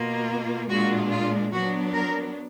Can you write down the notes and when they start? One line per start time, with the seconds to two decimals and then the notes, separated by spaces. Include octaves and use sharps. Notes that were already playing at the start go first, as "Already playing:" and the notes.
Already playing: B2 A#3 F4
0.68 A#2 G#3 D4 F4 F#4
1.10 F4
1.52 F#3 B3 D4 F#4
1.93 A#4